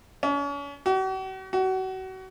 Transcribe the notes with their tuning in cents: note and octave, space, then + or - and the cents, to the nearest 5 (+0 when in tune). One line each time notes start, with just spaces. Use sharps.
C#4 +40
F#4 +45
F#4 +30